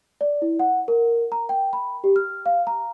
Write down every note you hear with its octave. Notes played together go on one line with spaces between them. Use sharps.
D5
E4
F#5
A#4
A#5
G5
B5
G4
F6
F5
A#5